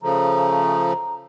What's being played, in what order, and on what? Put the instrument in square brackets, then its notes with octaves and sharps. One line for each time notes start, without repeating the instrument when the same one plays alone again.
[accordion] C#3 F3 A3 [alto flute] A#5